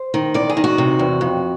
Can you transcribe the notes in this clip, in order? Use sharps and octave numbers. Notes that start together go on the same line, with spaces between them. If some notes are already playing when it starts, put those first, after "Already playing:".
Already playing: C5
D#3
E2 D5
G#4
D#3
F#4
C3
E2
F2